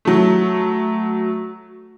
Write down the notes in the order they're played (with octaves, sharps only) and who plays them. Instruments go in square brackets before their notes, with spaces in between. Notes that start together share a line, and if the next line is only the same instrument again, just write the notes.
[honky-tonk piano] F#3 A3